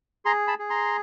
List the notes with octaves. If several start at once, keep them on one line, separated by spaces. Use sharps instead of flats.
G#4 A#5 C6
A5 B5
G#4
A#5 C6